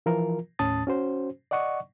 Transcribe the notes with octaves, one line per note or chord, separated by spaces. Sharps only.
E3 F3 F4 A#4
D#2 A2 C#4 A5 D#6 A6
C#4 F#4 C5
D5 D#5 F#5 C#6